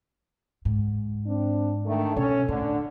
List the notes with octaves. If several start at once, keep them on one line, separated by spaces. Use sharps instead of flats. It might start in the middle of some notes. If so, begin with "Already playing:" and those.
G#2
C4 D4
D3 D#3 A3
B2 C#4 A4 C#5
A2 D3